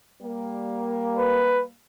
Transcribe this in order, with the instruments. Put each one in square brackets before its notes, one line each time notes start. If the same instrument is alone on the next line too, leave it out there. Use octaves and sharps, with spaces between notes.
[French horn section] G3 A#3
[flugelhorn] B4